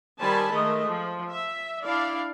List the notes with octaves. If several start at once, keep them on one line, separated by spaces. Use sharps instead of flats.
D#3 G3 C5 G#5 A5 B5
D#3 G#3 A3 D#5
F3
E5
D4 E4 D5 F5